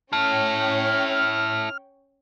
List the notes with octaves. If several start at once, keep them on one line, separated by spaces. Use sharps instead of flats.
C#4 E4 A4 C#5 G5 F6